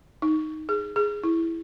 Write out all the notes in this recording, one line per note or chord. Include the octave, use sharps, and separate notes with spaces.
D#4
G#4
G#4
E4